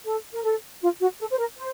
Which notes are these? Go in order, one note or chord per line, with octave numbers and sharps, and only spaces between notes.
A4
A#4
A4
F4
F#4
A4
C5
A#4
C5